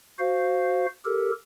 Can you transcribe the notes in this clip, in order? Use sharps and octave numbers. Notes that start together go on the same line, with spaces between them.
F#4 C5 F5
G4 A4 A#4